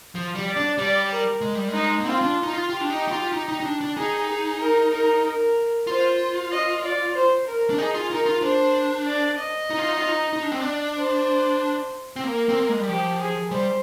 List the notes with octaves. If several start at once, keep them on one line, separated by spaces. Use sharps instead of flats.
F3
G3
D5
D4
G3 D5
A#4
G#3
G3
G#3 D#4
A#3
C4 F4
D4
D#4
F4
F4 G4
D4
D#4
D#4
F4
D#4
D#4
D#4
D4
D4
D#4 G#4
G#4
A#4
A#4
A#4
F4 C5
D#5
D5
C5
A#4
D4
D#4 G#4
F4
D#4 A#4
F4
D4 C5
D5
D#5
D#4
F4
D#4
F4
D#4
D#4
D4
C4
D4
C5
C4
A#3 A#4
C4
A#3
G#3
G3
F3 G4
G#4
G3 C5